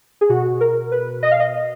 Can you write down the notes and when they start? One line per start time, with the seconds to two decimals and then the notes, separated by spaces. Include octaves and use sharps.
0.21 G#4
0.29 B2 F#4
0.61 A#4
0.92 B4
1.23 D#5
1.31 F5
1.40 D#5